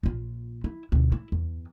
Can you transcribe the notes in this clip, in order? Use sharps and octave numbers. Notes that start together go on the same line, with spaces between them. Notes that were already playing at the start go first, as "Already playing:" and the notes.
A#1 F4
E4
D2 B2
E4
E2